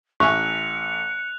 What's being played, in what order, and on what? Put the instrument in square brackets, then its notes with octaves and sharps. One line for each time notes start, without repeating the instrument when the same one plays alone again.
[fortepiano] A1 E5 G#5 [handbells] C#6 [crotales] F#6 F7 [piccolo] C#7